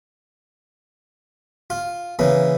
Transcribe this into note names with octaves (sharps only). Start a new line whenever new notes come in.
F4
C#3 E3 A#3